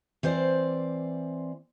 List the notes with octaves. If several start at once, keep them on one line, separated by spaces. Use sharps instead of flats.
E3 C4 C5 D5